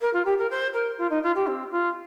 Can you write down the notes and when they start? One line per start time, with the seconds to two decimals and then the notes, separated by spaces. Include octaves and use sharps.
0.01 A#4
0.13 F4
0.25 G4
0.38 A#4
0.50 C5
0.73 A#4
0.98 F4
1.10 D#4
1.23 F4
1.35 G4
1.47 C4
1.71 F4